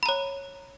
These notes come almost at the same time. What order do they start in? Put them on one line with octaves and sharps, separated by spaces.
B5 A#5 C#5